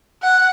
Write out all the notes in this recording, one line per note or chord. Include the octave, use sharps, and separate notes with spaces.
F#5